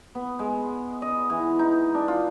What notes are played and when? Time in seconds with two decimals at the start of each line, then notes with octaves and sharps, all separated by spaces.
0.15 B3
0.39 G#3
1.02 D#5
1.30 E3
1.59 D#4
1.95 D4
2.08 F4